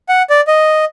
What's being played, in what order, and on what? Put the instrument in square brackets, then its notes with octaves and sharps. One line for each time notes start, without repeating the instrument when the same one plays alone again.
[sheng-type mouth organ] F#5
D5
D#5